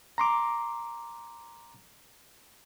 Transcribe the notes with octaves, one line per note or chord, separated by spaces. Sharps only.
A#5 C6 D6